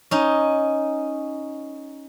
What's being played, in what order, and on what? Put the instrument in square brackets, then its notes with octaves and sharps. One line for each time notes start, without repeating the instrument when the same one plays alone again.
[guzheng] C#4 D#4